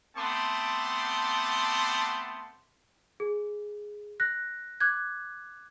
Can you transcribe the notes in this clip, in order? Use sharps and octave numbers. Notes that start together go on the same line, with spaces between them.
A3 B3 C4 A5 C6 D6
G#4
F#6 A#6
D6 F#6 G#6